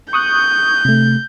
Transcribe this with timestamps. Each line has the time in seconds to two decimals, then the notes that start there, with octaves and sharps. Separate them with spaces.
0.13 C#6 D#6 F#6 G6
0.85 C3 A3